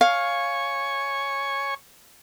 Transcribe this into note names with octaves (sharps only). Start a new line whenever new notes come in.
C#5 F5 G#5 C#6